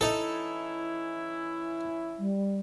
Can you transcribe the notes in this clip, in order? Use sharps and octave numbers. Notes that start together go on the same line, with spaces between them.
E3 C#4 D#4 E4 A4
G3